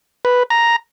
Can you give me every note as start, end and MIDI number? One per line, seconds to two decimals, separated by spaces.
0.25 0.43 71
0.50 0.76 82